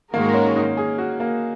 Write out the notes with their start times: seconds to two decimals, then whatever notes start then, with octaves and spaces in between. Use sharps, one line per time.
0.13 G#2 D#3 G#3 A#3 F#4 A#4
0.34 C#4
0.56 D#4
0.77 G#4
0.98 F#4
1.20 A#3